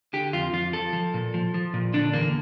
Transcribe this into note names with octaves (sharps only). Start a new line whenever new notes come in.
D3 G4
F2 F4
F2 F4
F3 A4
F3
A#2
F3
F3
A#2
D3 D4
E2 A#3